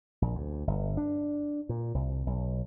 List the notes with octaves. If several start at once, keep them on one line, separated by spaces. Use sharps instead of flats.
A#1
D2
G1
D4
A#2
C2
B1